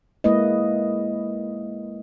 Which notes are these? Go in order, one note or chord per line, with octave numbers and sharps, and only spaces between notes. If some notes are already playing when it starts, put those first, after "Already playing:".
G#3 A#3 E4 B4 D#5